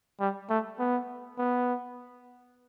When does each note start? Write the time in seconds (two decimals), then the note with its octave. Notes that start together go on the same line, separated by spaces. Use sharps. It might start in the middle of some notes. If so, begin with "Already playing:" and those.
0.20 G3
0.50 A3
0.80 B3
1.38 B3